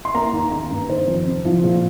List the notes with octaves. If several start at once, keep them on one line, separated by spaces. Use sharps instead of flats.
C6
A#3 A#5
D#2
A#3 A#5
G2
D#3 C5
F2
C3
F3
A#2